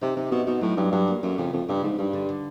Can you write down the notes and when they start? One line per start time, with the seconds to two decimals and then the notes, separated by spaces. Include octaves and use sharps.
0.01 C3 D#4
0.16 C3 D#4
0.31 B2 C4
0.47 B2 D#4
0.61 A2 F#3
0.77 G2 F#3
0.92 G2 F#3
1.08 A#3
1.23 F#2 A3
1.38 F2 C#3
1.53 F2 A3
1.68 G2 C#3
1.82 G#2 G3
1.98 G2 G3
2.13 D3
2.29 D3